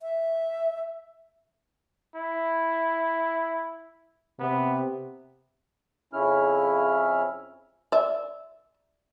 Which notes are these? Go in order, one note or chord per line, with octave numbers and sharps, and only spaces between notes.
E5
E4
C3 B3
F2 C#3 C#4 E4 F6
D5 E5